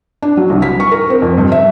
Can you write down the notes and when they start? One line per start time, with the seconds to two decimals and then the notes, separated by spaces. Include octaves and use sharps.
0.22 D4
0.37 F#3
0.50 C2
0.62 B6
0.80 C#6
0.92 A#4
1.10 C4
1.22 F2
1.38 G2
1.52 E5